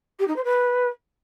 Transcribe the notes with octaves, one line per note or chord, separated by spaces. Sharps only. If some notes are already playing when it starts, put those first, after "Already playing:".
G4
D#4
C5
B4